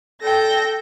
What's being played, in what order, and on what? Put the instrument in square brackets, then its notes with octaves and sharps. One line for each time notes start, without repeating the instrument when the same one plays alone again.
[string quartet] A4 G5 A#6